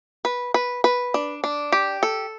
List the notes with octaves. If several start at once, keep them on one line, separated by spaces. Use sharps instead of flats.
B4
B4
B4
D4
D4
G4
A4